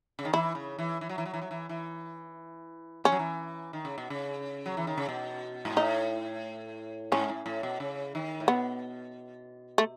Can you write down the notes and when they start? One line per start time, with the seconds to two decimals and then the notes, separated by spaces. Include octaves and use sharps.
0.19 C#3
0.25 D#3
0.33 E3 E4
0.55 C#3
0.79 E3
1.01 E3
1.09 F#3
1.18 E3
1.25 F#3
1.33 E3
1.42 F#3
1.51 E3
1.69 E3
3.04 E3 C#4
3.12 F#3
3.19 E3
3.73 D#3
3.85 C#3
3.98 B2
4.10 C#3
4.66 F#3
4.77 E3
4.87 D#3
4.97 C#3
5.09 B2
5.65 G#2
5.76 A2 D#4
7.12 G#2 C#4
7.30 A2
7.46 A2
7.63 B2
7.80 C#3
8.15 D#3
8.40 A2
8.48 B2 B3
9.78 A3